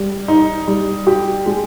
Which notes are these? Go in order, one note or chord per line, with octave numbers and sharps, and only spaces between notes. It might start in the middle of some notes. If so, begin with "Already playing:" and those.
Already playing: G3
D#4
G3
G4
G#3